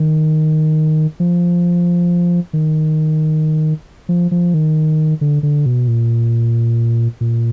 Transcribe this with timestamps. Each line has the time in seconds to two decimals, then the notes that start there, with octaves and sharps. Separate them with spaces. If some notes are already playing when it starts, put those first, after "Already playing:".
Already playing: D#3
1.20 F3
2.53 D#3
4.09 F3
4.31 F3
4.54 D#3
5.21 D3
5.43 D3
5.66 B2
5.88 A#2
7.21 A#2